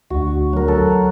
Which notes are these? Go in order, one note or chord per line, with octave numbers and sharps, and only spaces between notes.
D2 F#4
F#3 A#4
A4